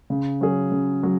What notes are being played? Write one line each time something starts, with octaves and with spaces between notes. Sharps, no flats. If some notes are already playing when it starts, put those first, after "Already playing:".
C#3
F#3 C#4 G#4
C#3
F#3